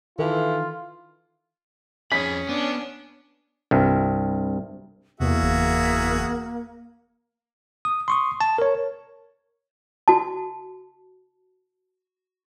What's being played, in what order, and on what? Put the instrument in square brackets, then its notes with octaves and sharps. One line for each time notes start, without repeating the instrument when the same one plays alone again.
[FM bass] D#3 [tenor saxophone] E3 [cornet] F4 [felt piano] A4
[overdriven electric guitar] F2 B5 [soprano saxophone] C#4 [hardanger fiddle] G#4 [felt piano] B6
[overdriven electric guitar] B3 [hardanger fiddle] D4
[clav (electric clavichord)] C2 G2
[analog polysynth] E2 [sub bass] C3 [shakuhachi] A#3 [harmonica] F#4 G#4 E5
[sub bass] F#1
[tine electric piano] D#6
C6 C#6 D#6
A5
A#4 C#5
[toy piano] F#4 A5